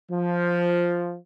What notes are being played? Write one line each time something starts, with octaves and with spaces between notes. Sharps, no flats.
F3